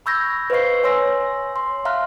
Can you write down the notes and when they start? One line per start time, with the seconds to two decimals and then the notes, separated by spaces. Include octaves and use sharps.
0.06 B5 C#6 E6 G6 G#6 A#6
0.50 B4 C5 D#5 F5 C#6 C7
0.83 C#5 G#5 C6 E6 A#6
1.56 C6
1.85 E5 F5 A#5 C6 F6 F#6